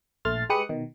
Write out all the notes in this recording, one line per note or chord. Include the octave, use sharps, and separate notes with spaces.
A#1 A3 C6 F6 A6
G#3 G4 B4 D#6 F#6 C#7
B2 D#3